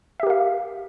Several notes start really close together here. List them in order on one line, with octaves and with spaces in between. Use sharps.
E5 G4 A#4 F5